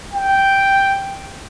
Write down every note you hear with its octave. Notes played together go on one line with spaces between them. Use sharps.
G5